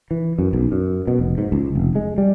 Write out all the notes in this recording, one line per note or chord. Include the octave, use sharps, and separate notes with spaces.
E3
F#2
B1
F#2
B2
F1
G#2
C#2
F1
G#3
G3